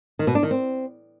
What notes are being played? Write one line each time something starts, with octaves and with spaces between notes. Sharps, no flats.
D#3
B2
D4
D#3
C4